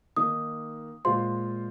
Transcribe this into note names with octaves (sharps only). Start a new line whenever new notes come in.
D#3 A#3 D#4 D#6
A#2 G#3 F4 C5 C6